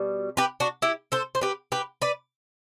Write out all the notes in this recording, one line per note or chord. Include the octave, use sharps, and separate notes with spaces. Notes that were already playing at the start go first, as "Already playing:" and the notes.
Already playing: B2 G3
G4 B4
D4 F#4
E4 G4
A4 C5
C5
G4 B4
G4 B4
B4 D5